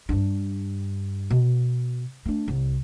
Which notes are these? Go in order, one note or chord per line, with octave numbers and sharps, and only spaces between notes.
G2 D4
B2
A3 D4
C2